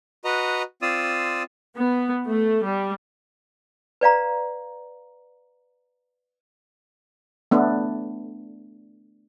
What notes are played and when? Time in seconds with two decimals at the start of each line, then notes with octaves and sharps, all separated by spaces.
0.25 F#4 B4 D#5 A#5
0.82 C4 F4 D5 D#6 E6
1.76 B3
2.27 A3
2.64 G3
4.01 B4 D5 F5 A#5
7.51 A3 B3 D4